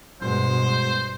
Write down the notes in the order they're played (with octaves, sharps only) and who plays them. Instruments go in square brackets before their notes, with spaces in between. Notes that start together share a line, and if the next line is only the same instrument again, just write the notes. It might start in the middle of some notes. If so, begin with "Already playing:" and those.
[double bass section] G2 B2 G#3 [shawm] C5